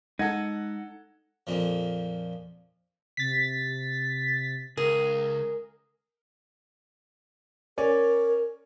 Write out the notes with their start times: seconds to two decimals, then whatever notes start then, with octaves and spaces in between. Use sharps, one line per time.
0.19 G#3 D#4 A4 F#5 G#6
1.47 F2 A#2 F3
3.17 C3 A6 B6
4.77 C#2 G#4 A#4
7.78 C#4 A#4 C#5 D5